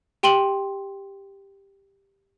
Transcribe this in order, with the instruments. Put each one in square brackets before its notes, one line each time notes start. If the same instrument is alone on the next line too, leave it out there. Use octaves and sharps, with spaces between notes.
[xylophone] G4 G5 C6 D#7 F#7